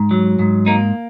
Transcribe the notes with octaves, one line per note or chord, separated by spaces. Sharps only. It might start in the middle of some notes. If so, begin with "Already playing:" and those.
Already playing: G#2
F#3
G#2
A#3 D#4